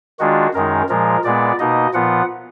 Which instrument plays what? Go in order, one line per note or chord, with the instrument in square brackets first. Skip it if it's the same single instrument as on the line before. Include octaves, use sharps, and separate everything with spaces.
[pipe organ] D#3 G#3 D4 F4 F#4
F#2 D#3 G#3 D#4 A#4
A#2 F3 G#3 A#4
A#2 G#3 B3 D5
B2 A#3 D#4 D#5
A#2 F3 B3 F4 F#5